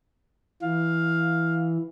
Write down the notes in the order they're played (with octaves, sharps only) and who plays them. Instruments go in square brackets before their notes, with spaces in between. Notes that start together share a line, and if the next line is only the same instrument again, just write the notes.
[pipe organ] E3 [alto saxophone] F5